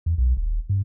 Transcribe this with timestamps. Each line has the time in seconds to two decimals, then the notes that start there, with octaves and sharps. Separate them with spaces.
0.06 E2
0.18 B1
0.37 D#1
0.69 G2